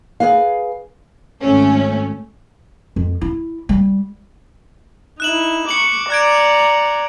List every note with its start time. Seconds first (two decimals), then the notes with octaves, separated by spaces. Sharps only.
0.20 G#4 B4 F5
1.41 G#1 A3 C#4
2.96 F2
3.21 E4
3.69 G3
5.20 D#4 E4 F#6 E7 F#7
5.69 C#6 D6 C#7 F#7
6.10 D5 A#5 F#6 G#6 D7